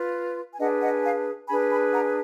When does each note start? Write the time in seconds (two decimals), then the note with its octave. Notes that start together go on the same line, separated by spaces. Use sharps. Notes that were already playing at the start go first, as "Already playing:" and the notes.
Already playing: F4 B4
0.52 G#5
0.59 D4 G#4 B4 D#5 F#5
0.82 D#5 F#5
1.04 F5 G#5
1.48 D4 G#4 B4 G#5 B5
1.71 G#5 B5
1.93 F#5 A#5